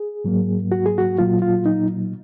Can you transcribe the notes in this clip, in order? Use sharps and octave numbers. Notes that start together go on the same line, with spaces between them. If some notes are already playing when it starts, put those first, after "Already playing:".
Already playing: G#4
G#2 F#3 A#3
F#4
G#4
F#4
A#2 F#3 A#3 F4
F4
D#4